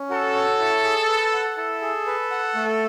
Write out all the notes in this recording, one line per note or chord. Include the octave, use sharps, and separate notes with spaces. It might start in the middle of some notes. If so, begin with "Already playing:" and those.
Already playing: C#4
F#4 A4
C#5
E4
G#4
B4
F#5
E4 A4
G#4
B4
F#5
A3